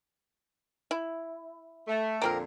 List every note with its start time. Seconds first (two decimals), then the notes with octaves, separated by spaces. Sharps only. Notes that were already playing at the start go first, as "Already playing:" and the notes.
0.91 E4
1.87 A3
2.22 F2 A#2 D3 A#3 C4 A#4